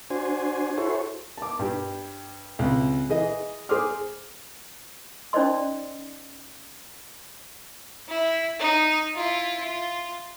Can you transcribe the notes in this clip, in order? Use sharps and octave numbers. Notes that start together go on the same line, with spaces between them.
D4 F#4 C5 G#5
E4 F#4 G#4 A4 C5 C#5
A5 D6
G2 G4
C#2 C3
E3 G#4 D#5
G#4 C5 C6 D6 F6
C#4 D#4 C5 D5 D#5 C6
E4
D#4
E4 F4
F4